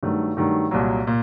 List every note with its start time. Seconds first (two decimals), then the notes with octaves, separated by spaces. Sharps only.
0.03 G2 D#3 F#3 A3
0.37 G2 D#3 F#3 A3
0.71 C2 A#2 F#3
1.07 A#2